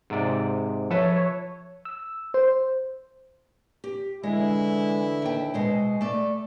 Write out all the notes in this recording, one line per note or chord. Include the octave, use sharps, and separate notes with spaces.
G#2 C3 D5
F3 A4 B4 C#5 E5
E6
C5
G4
D3 E3 G#3 E4
D#2 G5
B2 G#3 C5
A3 D5